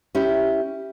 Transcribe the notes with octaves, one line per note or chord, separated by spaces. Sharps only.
C#4 E4 G4